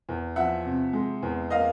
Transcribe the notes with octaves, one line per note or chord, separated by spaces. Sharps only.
E2
F3 E5 F#5
C3
G#3
E2
A#3 D#5 F5